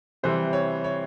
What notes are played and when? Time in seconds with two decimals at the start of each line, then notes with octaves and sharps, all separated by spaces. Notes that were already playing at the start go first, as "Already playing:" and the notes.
0.23 C3 E3 G3 C5
0.53 C#5
0.84 C#5